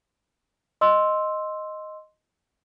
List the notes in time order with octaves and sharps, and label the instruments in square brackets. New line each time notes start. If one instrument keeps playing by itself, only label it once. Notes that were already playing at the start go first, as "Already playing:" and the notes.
[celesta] D#5 C6 E6